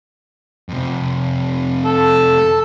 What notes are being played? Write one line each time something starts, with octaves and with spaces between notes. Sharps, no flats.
F2 C3
A4
A5